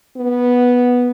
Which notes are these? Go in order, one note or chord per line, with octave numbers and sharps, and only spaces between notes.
B3